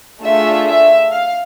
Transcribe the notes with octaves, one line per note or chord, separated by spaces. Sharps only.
A3 D4 F4 G#4 E5
E5
F5